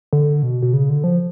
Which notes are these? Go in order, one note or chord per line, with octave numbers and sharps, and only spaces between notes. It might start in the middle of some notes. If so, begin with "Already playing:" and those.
D3
B2
B2
C#3
D3
F3